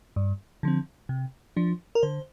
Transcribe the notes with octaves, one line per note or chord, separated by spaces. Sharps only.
G2
D3 F3 C4
C3
F3 D4
A#4
D3 C5